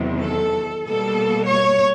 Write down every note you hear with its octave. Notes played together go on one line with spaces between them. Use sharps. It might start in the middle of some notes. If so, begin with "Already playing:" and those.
Already playing: E2 C3 D#3 F#3
A4
B2 G3 A#3 A4
C#5